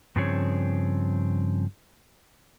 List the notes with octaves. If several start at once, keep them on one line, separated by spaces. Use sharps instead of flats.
G2 C#3 F3 C4 G#4 C#5